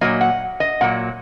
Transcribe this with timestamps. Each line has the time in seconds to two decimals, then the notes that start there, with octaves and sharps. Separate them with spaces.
0.01 A#2 F#3 A#3 D#5
0.21 F#5
0.60 D#5
0.81 A#2 F#3 A#3 F#5